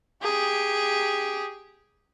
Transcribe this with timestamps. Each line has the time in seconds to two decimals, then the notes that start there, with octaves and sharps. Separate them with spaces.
0.23 G4 G#4